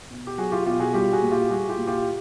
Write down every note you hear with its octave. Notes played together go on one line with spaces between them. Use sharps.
B2
G4
F#3 F#4 G#4
F4 G4
B2 F4 G4
F#4 G#4
G3 F4 G4
F#4 G#4
A#2
F4 G4
G3 F#4 G#4
F4 G4
A#2
F4 G4